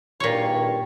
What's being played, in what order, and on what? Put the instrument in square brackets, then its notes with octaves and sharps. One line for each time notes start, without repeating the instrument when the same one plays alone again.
[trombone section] A#1 G2 D#3 [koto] A#2 C#5